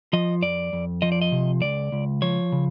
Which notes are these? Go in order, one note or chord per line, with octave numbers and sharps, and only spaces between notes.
F3 D#5
F2 D5
F2
F3 D#5
D5
D#5
C3
C#2 D5
C#2
F3 C#5
C#3